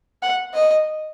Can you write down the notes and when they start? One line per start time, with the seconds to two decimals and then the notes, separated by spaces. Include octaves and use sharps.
0.23 F#5
0.54 D#5